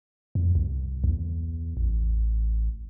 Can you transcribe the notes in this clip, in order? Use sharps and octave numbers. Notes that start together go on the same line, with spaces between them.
F2
C2
E2
A1